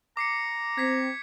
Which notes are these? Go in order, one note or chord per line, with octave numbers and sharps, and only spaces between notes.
A#5 D6 C7 C#7
C4 G#6 B6 C7